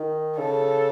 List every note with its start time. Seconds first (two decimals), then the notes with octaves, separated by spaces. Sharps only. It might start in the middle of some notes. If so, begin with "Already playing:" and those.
Already playing: D#3
0.38 C#3 A4